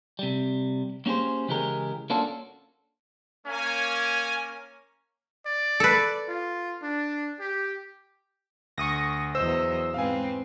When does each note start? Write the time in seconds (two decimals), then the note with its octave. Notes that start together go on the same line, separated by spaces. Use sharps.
0.19 C3 G3
1.06 A#3 C#4 G4 G#4 C5
1.48 C#3 E3 G#3 G4 G#4 A#4
2.10 A#3 C#4 D4 F4 F#4 A4
3.47 A#3 C#4 G#5
5.46 D5
5.80 A4 B4
6.29 F4
6.82 D4
7.40 G4
8.78 D2 C#6 D#6 A#6
9.35 E2 F#3 C5 D#5 E6
9.94 G#2 C4 B4 F5 G#5